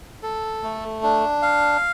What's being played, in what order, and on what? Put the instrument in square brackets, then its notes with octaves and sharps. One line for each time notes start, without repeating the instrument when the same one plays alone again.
[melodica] A4
A3
D4
F5